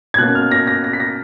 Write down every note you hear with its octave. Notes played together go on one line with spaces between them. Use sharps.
G#6
B2 A#3 C#4 F#6
F6
A#6
A#6
A#6
B6
A#6